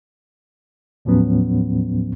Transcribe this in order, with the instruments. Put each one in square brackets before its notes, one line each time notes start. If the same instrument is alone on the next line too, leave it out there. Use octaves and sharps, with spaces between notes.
[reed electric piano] D#2 A2 F3 F#3 B3 C#4